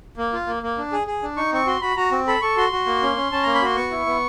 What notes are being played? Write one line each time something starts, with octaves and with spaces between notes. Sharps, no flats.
A#3
F4
A#3
A#3
D4
G#4
G#4
D4
D#4 C#6
C4 C#6
F#4 C6
F#4 B5
F#4 A#5
C4
A4 B5
A4 C#6
F#4 C6
F#4
A#3
C#4
C#4
C#4 A5
A#3 A#5
B5
F#4 C6
B3 C#6
E4
B3